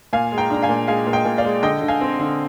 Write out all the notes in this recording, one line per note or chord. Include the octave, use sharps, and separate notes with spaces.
A#2 F5 G#5
G#3
G5 A#5
D4 A#5
F5 G#5
A#2
G#3 F5 G#5
A#2
D#5 G5
A#2
D5 F5
G#3
D3 D#5 G5
D3
F5 G#5
C4
D3